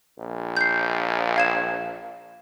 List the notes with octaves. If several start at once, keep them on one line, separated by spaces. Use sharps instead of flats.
A#1
G6 C7
F5 G#6 E7